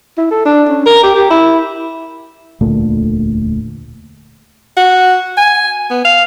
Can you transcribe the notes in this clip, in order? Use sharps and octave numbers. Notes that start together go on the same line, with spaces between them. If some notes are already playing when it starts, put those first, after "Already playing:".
E4
A4
D4
C#4
A#4
G4
G4
E4
E1 D2 A#2 A3
F#4
G#5
B3
F5